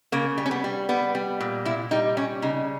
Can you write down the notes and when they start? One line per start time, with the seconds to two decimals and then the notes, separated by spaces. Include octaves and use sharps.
0.12 C#3 A#3
0.38 G3
0.46 C#4
0.51 B3
0.64 G3
0.89 G3 B3
1.15 G3
1.40 A#2
1.65 A#2 E4
1.91 G3 D#4
2.17 G3 C#4
2.42 C#3 D#4